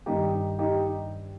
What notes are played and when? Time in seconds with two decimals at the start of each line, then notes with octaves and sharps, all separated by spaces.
0.06 G2 D#3 G3 D#4 G4
0.59 D#4 G4